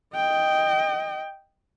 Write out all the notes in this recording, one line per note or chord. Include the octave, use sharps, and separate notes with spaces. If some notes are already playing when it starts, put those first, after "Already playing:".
D#5 G5